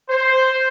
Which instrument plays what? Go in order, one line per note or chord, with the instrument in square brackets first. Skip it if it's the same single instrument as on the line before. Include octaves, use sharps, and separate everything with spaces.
[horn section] C5